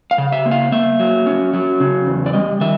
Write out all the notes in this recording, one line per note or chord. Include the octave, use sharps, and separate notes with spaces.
F5
C#3
E5
A#3
F5
A#3 E5
F#3
C#4
F#3
C#3
E2
D5
G3 D#5
D#3 E5